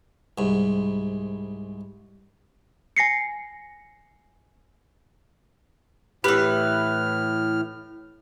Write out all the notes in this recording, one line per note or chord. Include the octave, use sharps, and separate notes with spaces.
C2 G#2
G#5 A#6 C7 C#7
A2 E3 G4 B4 F6